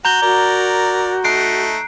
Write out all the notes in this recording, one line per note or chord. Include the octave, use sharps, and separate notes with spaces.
F#4 A#5 G6 G7
F#4 A#4 D5
A3 D#4 F#6 C7 D7